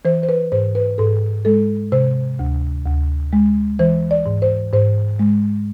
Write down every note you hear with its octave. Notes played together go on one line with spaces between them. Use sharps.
E3 C5
C5
B4
G#2 C5
B4
G#2 A4
G#3 A4
C3 C5
D2
D2
G#3
E3 C5
D5
G#2
C5
G#2 C5
G#3